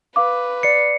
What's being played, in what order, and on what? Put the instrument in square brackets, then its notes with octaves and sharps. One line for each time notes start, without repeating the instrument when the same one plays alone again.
[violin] B4 [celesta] F5 D6
[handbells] D5 C7 [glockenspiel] C#7